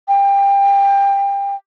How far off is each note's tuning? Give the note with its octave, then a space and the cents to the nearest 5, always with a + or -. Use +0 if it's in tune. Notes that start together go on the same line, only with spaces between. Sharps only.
G5 +25